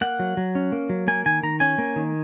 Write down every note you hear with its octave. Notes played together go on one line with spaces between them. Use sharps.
A#3 F#5
F#3
F#3
C#4
A#3
F#3
A#3 G#5
D#3 G#5
D#3 A#5
C#4 G#5
A#3
D#3